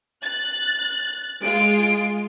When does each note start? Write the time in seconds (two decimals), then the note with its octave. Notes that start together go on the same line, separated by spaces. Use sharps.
0.23 F#6 A6
1.43 G#3 F4 D7